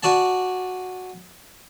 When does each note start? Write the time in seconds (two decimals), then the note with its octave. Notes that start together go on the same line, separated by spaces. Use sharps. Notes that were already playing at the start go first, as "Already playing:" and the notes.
0.03 F#4 D5 G#5 A5